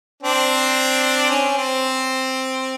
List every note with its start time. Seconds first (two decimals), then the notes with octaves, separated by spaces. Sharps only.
0.22 C4 D4
1.30 C#4
1.57 C4